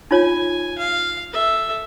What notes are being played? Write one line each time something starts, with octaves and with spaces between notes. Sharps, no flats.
D#4 F4 C#5 G#5
F5
A4 E5